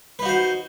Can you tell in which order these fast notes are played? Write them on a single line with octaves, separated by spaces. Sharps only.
B4 D#4 F#4 C5